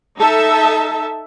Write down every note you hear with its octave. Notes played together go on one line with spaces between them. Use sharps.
D#4 A4 E5 A5